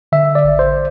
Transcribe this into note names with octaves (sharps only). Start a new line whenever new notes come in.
D3 E5
D5
A1
C5